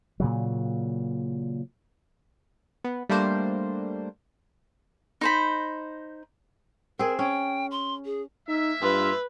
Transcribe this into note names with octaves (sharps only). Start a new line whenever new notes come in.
A#2 C#3 F#3
B3
G3 A3 A#3 D4 C5
D#4 C5 B5
C4 G#4 A#4
C#4 G5
C6
G#4
A#3 D#4 E5
G2 F4 B4